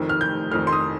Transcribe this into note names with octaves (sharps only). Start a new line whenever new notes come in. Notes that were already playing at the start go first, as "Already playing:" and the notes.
Already playing: F1 F2 D#3
F6
G6
F1 F2 D#3 F6
C6
D#6